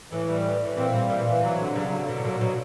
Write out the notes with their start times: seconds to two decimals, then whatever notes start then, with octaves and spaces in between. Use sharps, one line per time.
0.11 A2 E3
0.28 G3
0.45 E3
0.61 A2 E3
0.77 A#2 C4
0.94 G3
1.10 A#2 E3
1.27 E3
1.43 C3 F#3
1.59 D3
1.76 C#3 F#3
1.92 D3
2.08 B2 D3
2.17 A2
2.24 A#2 F#3
2.41 B2 F#3